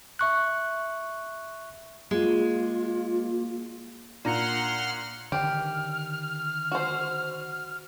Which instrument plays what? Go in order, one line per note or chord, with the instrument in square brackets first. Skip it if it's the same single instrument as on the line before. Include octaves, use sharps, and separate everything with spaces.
[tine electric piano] E5 C#6 F#6
[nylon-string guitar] G#3 [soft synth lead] A#3 [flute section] F4
[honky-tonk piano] A#2 [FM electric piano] D4 A#5 C#7 [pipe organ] F#5 C6 F6
[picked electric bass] D3 D#3 [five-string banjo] G4 [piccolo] F6
[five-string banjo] F#4 C5